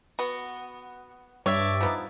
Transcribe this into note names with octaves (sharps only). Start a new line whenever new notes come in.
B3 F#4
G2 C#5 D5 E5
F3 B3 D#4